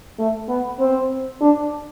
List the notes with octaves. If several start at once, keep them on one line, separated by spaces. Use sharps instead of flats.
A3
B3
C4
D4